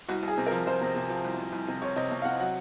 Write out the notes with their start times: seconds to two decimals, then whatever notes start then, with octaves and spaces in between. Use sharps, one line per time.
0.08 C2 F#4
0.23 C2
0.28 G#4
0.38 C3
0.47 A#4
0.51 F3
0.66 F3 C5
0.81 C3
0.96 C3
1.10 F3
1.25 C2
1.38 C2
1.53 C2
1.68 C3
1.82 C3 C#5
1.96 C3 D#5
2.11 C3
2.22 F5
2.25 C3 F#5
2.40 F#3 F#5